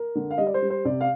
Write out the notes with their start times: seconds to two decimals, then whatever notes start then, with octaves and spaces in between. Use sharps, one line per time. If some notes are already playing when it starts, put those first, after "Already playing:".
Already playing: A#4
0.15 D3
0.31 F5
0.38 G3 D#5
0.47 D5
0.54 C5
0.62 G3
0.70 C5
0.85 C3 D5
1.01 F5